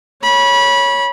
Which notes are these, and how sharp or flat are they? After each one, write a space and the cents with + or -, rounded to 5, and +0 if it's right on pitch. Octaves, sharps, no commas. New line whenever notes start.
C#5 +0 B5 -25